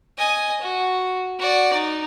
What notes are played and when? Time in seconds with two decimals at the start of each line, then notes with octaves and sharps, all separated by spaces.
0.18 D#5 G#5
0.61 F#4
1.39 F#4 D5
1.73 D#4